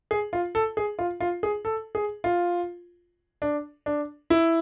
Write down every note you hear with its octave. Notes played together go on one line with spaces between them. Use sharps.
G#4
F4
A4
G#4
F4
F4
G#4
A4
G#4
F4
D4
D4
E4